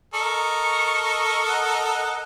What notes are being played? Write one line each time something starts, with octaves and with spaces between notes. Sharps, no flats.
A4 A#4 D#5 C#6
F#5